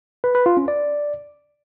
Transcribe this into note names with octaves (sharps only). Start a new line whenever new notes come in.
B4
B4
F4
C#4
D5